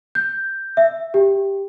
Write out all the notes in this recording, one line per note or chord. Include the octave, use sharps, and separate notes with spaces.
G6
E5
G4